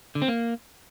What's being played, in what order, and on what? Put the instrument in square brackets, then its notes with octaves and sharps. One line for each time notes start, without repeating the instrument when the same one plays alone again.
[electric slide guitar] D3
C4
A#3